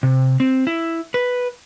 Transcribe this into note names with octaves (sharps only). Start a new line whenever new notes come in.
C3
C4
E4
B4